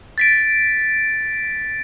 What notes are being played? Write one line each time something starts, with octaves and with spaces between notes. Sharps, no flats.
A6 B6 D7